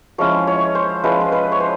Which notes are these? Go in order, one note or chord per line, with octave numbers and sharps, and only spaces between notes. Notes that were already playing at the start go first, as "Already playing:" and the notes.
F3 G#3 C#4 E4 C#5
C#5
C5
F3 G#3 C#4 E4 B4
C5
B4
C#5
C5